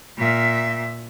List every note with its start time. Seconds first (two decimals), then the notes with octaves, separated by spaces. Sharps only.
0.18 A#2 E5